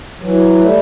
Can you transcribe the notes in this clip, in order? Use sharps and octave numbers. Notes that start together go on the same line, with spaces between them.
E3 F#3
G3 A3